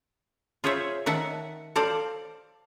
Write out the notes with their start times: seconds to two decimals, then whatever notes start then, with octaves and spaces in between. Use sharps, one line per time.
0.64 F4 G#4 C5 C#5 E5
1.06 D#3 E5 F#5 A5
1.76 A4 C5 D5 F5